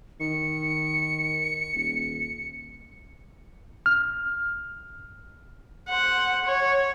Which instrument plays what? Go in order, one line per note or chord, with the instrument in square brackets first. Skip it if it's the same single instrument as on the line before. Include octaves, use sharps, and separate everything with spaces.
[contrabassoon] D#3 [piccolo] C#7
[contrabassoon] D#1
[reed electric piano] F6
[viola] C5 F#5
C#5